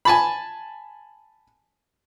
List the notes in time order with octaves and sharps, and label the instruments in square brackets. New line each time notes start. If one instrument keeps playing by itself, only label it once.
[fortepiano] G#5 A5 B5